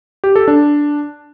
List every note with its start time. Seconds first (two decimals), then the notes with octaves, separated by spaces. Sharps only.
0.24 G4
0.36 A4
0.48 D4